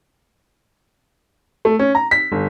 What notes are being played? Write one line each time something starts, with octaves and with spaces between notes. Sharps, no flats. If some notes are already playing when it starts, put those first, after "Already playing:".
A3
C#4
A#5
B6
G1